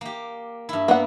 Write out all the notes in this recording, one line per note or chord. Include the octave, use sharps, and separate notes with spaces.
A#3 G4
G2 E4
A#3 B3 F#5